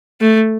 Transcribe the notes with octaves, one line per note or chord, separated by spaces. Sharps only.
A3